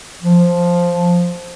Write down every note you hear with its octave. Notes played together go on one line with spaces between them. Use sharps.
F3